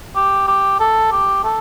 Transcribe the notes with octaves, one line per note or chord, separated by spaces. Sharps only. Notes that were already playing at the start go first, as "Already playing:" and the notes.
G4
G4
A4
G4
A4